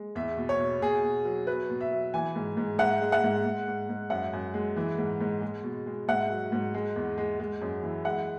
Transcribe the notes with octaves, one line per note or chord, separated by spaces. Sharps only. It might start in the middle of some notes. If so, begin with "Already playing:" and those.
Already playing: G#3
E2 E5
B2
C#5
B2
B2 G#4
B2
F#3
F#3 B4
B2
E5
F#3
E3 G#5
G#2
G#2
G#2 F#5
G#3
F#5
G#2
G#2
G#2
G#2
F#2 F#5
F#2
G#3
E3
G#2
G#2
G#3
B2
G#3
G#2 F#5
F#3
G#2
G#3
E2
G#3
G#3
F#2
E3
G#3 F#5